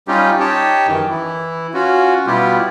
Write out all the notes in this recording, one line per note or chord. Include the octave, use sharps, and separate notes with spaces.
G3 C#4 D#4 F4 G4
D#4 G4 C#5 G5 A5
F#2 D#3 E3
E3 E4
C#4 F4 F#4
B2 G3 B3 E4 F4 G4